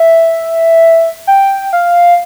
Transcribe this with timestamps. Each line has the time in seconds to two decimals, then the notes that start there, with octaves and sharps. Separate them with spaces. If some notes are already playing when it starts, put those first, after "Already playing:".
Already playing: E5
1.27 G5
1.73 F5